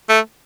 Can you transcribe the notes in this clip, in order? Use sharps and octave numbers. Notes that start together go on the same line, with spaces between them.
A3